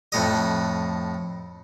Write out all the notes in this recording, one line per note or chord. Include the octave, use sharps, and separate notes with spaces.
F2 A2 D#5